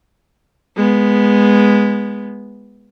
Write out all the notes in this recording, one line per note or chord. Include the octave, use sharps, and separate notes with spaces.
G#3 B3